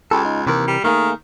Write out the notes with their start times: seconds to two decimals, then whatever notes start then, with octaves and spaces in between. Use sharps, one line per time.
0.11 C#2 G4 A4
0.25 D#4
0.47 D#2 C3 E3 A#4
0.67 G3
0.84 D#3 A3 A#3 G#4